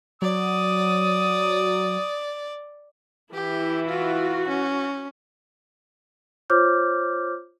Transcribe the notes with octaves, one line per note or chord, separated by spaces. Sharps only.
F#3 D5 D#6
E3 E4 G4
F4 F#4
C#4
F4 C5 C#5 D6 F6 G6